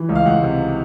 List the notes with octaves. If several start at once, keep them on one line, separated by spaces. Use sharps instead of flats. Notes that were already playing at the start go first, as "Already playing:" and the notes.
Already playing: E3
C#2
F5
C#2 F#5
C3